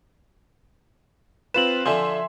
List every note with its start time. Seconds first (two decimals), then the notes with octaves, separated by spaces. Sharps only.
1.54 C4 F4 B4 E7 F#7
1.86 D3 F3 E5 G#5 C6